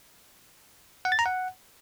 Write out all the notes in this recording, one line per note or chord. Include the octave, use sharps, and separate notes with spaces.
F#5
A6
A#5
F#5